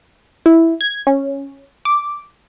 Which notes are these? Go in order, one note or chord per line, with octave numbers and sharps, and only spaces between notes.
E4
G#6
C#4
D6